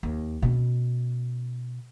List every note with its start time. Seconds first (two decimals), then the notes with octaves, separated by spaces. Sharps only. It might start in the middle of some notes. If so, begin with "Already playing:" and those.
0.03 D#2
0.42 B2 C#4